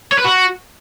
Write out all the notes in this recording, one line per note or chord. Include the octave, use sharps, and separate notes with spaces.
C#5
B4
F#4